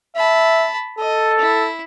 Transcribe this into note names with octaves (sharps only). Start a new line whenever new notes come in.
E5 A5 B5
A4 D#5
E4